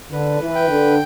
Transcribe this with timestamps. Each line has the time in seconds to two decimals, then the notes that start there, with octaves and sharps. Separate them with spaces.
0.12 D3 B4
0.41 E3
0.55 G5
0.69 D3